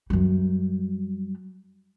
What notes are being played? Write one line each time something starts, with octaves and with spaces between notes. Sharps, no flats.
F#2 G3